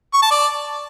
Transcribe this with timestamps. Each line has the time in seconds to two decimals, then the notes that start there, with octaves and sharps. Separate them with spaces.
0.14 C#6
0.22 A5
0.31 D5